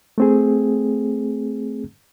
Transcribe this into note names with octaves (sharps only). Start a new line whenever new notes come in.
A3 C4 G#4